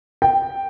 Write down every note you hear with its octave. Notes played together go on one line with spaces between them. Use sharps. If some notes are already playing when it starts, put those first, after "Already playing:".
G5